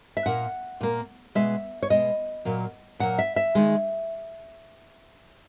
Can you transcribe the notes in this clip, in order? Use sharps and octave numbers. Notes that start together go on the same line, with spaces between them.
E5
A#2 A#3 F#5
A#2 A#3
B2 G#3 E5
C#5
B2 G#3 D#5
A#2 F#3 A#3
A#2 F#3 A#3 F#5
E5
E5
D#3 G#3